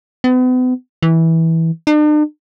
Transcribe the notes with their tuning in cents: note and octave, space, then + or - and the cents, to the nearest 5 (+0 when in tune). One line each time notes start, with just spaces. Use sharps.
B3 +40
E3 -15
D4 +45